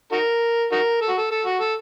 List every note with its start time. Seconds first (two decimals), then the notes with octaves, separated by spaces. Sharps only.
0.12 D#4 F#4 A#4
0.72 D#4 F#4 A#4
1.01 A4
1.09 F#4
1.17 A4
1.31 A4
1.45 F#4
1.60 A4